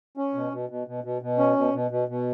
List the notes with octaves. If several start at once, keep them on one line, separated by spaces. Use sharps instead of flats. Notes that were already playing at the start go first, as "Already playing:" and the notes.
C#4
B2
B2
B2
B2
B2
B2
C#4
B2
B2
B2
B2